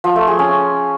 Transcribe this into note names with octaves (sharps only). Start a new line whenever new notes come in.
F3
A3
G#4
C#4